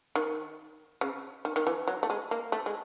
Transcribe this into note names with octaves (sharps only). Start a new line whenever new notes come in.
D#3
C#3
D#3
D#3
E3
F#3
A3
G#3
A#3
A3
G#3